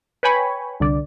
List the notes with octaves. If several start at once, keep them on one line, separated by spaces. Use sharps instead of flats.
B4 C#5 G5 G#5 B5 C#6
C2 D3 D5